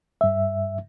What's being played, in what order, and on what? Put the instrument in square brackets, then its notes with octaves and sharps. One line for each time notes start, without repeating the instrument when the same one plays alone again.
[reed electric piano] G2 E5